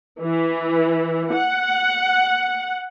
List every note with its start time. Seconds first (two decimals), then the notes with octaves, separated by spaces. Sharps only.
0.22 E3
1.33 F#5